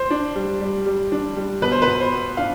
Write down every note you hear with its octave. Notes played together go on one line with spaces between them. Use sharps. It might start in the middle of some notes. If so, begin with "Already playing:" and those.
Already playing: C5
D4
G3
G3
G3
D4
G3
B2 B4
C5
B4
B2
C5
B3
D4 F5